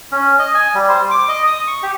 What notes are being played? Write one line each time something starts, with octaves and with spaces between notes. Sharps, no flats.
C#4
D#5
G#5
G3
C5
D6
D#5
D#6
C#6
G4